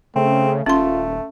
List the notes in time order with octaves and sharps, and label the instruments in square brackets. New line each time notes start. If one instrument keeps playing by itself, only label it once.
[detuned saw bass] C#3 [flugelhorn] A3 [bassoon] C4
[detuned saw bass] D#1 [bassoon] A3 [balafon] C#4 C6 [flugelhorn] F4